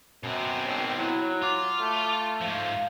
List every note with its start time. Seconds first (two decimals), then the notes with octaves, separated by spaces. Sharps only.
0.23 F#2 B2 C4
0.66 G#1
0.98 F#3 E4
1.42 F4 D6
1.80 A3
2.41 G#2 F3 F5